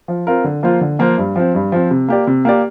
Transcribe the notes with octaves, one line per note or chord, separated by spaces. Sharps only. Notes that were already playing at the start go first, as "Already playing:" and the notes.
F3
C4 F4 A#4
D3
F3 A#3 F4 C5
D3
F3 A#3 F4 C5
G2
F3 C4
G2
F3 C4
C3
A#3 G4 D5
C3
A#3 G4 D5